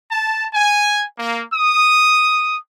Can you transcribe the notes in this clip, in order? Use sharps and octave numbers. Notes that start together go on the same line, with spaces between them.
A5
G#5
A#3
D#6